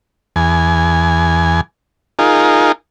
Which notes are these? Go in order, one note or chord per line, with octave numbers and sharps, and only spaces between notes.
E2 G#5
D#4 F4 G#4 A#4